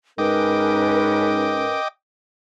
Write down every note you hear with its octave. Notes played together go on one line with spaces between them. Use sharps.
G#2 C#4 A#4 B4 D#5 G5 D6